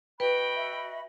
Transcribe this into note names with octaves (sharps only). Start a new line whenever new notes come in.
F#4 B4 D#5 G5 B5
E5